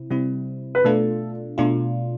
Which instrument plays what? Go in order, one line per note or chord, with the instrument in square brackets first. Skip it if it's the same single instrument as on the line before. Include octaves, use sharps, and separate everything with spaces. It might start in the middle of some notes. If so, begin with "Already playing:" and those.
Already playing: [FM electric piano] C3 C4 E4
C3 G3 C4 E4
[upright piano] B4
[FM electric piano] B2 A3 D4 F4 [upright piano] A4
[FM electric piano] B2 A3 D4 F4